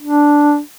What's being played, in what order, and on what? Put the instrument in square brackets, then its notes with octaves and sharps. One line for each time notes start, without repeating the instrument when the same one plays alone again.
[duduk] D4